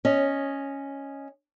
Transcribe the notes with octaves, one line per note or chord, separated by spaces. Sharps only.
C#4 D#5